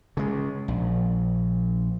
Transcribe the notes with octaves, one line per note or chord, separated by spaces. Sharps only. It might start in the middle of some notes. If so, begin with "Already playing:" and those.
C#3 G#3
A#1